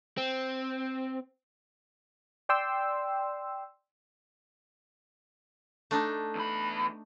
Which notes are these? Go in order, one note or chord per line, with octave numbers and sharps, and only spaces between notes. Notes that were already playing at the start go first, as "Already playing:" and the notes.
C4
D5 G5 C6 E6
A3 D4 D#4
E2 B5